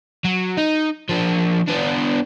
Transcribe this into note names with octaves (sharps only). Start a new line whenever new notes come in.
F#3
D#4
F3 D4
B3 D4